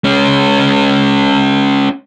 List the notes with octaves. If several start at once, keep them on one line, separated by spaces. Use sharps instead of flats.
G#3 C#4